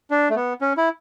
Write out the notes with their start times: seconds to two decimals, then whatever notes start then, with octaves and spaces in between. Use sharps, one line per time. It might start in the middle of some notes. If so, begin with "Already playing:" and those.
0.11 D4
0.30 A3
0.36 B3
0.61 C#4
0.77 E4